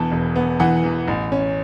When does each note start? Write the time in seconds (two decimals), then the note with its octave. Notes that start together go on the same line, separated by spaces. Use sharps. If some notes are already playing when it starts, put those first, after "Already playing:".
Already playing: E1 E2 E3 B3 A5
0.12 E1
0.36 B3
0.60 E3 F#5
0.84 E2
1.08 A1
1.32 C#4